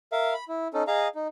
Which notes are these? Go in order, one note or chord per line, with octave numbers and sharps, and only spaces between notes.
A#4 E5 F5
B5
E4
C#4 D#4 A4
G#4 D#5 F5 A#5
D#4